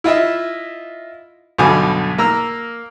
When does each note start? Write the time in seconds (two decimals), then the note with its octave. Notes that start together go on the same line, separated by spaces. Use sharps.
0.04 E4 F4 D#5 E5
1.59 B1 G2 B2 D3 G#5 D6
2.18 A#3 A#5 E6